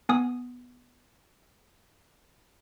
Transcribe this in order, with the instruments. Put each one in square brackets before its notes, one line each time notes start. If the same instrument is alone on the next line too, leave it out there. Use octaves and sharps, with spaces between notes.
[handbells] B3 G#5 D#6